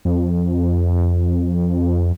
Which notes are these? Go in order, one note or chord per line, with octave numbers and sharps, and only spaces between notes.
F2